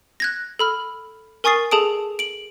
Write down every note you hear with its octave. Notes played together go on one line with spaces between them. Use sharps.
F#6 G#6 A#6
A4 B5 F6
A#4 G#5 C#6 D#6 A6 C7
G#4 A4 A5 D#6 D7
D7 F#7